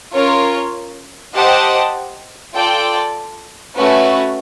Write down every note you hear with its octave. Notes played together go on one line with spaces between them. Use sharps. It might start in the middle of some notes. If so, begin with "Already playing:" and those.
C#4 F4 A#4 C#5
G4 C5 D#5 F#5 A5
F4 A4 D5 G5
A3 C#4 F#4 B4